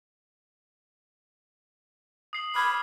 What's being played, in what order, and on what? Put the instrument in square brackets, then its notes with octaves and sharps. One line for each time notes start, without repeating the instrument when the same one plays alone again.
[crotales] D#6 C7 F#7
[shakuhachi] B5 [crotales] D6 F6 G#6